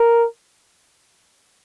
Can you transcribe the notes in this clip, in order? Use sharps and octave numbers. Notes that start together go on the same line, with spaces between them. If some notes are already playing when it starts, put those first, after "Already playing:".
Already playing: A#4